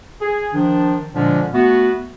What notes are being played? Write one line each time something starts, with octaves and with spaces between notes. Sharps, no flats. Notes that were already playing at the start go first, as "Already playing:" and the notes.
G#4
D#3 F3 D4
A#2 D3 F3 G#3 C#4 D4
A3 B3 F#4